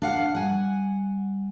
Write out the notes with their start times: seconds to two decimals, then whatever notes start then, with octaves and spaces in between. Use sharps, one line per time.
0.02 D4 F5 F#5
0.35 G3 F#5 G#5